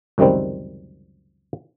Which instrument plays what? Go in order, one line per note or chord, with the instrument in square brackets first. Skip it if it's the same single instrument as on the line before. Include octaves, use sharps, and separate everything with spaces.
[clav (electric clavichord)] C#2 F#2 C3 D#3 G3 C4